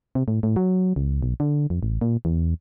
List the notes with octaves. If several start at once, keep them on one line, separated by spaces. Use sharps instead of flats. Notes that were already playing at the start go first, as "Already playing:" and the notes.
C3
A2
A2
F#3
C#2
B1
D3
F2
A1
A#2
E2